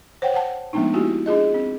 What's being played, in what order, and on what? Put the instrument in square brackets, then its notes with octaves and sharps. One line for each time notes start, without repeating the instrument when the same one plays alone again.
[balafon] C5 C#5 F#5 G5
F#5 A5
F3 G#3 A3 B3 D4 D#4
G#3 A#3 E4 F#4 G4
D4 F4 G#4 D#5
C4